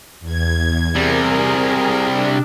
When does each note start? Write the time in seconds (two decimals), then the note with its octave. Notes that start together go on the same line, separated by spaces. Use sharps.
0.20 E2 G#6
0.95 C3 G3 G#4 A#4
2.04 D4